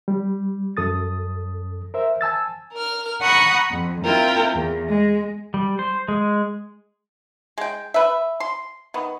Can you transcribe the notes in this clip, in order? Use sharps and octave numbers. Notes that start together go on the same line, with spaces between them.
G3
F#2 A4 D#6 A6
A#4 C5 E5
G#5 A5 E6 A6
A#4 F6
F#5 A#5 B5 C#6 D#6
F2
C4 E4 F4 A#4 G5
E2
G#3
G3
C5
G#3
G#3 G5
B4 E5
C6
D#3 B3